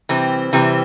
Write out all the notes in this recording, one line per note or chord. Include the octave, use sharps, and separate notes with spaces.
C3 E3 G3 C4
C3 E3 G3 C4